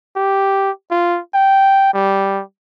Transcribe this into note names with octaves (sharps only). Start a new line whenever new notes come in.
G4
F4
G5
G3